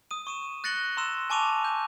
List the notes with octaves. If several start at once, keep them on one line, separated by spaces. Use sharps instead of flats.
D#6 D#7
C#6 D#7 E7
F#6 A6 A#6 C#7 F#7 G7
A#5 C6 E6 E7
G#5 A5 C#6 D6 D#7 F7
G6